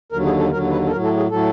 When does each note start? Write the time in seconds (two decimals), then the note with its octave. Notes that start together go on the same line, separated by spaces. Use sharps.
0.12 D#2 D3 F#3 A#4
0.26 G#4
0.39 A4
0.52 D#2 D3 F#3 A#4
0.71 B4
0.87 A4
0.91 A2 F#3 A#4
1.04 A4
1.17 G#4
1.31 A2 F#3 A4